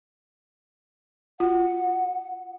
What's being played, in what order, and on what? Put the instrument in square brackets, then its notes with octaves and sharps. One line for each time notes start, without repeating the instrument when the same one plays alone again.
[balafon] F4 F#4 [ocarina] F#5